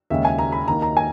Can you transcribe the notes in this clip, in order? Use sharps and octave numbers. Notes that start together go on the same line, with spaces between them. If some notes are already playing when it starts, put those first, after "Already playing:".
D#2 C#3 G#3 E5
G#5
A#5
B5
D#2 D#3 A#3 A#5
A#5
G#5